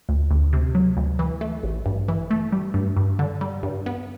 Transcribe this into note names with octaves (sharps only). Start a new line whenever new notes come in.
D2
D2
C3
F#3
D2
E3
A3
A1
G2
E3
A3
G3
G2
G2
D3
G3
G2
B3